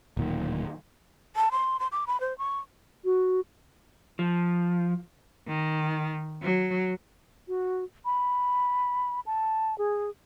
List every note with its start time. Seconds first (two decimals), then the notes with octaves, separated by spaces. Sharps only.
0.17 D1 A#2 D#3
1.36 A5
1.52 C6
1.80 C6
1.92 D6
2.07 B5
2.21 C5
2.38 C#6
3.04 F#4
4.19 F3
5.48 D#3
6.43 F#3
7.48 F#4
8.05 B5
9.26 A5
9.78 G#4